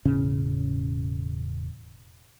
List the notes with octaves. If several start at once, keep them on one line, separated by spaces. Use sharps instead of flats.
E1 A2 C#3 C#4